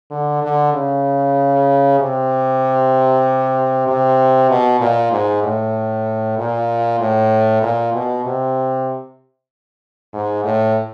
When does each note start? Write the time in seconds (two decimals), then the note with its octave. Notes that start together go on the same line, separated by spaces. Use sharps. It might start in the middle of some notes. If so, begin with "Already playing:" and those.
0.11 D3
0.43 D3
0.74 C#3
1.99 C3
3.87 C3
4.50 B2
4.81 A#2
5.12 G#2
5.43 A2
6.38 A#2
7.00 A2
7.63 A#2
7.94 B2
8.25 C3
10.14 G#2
10.44 A2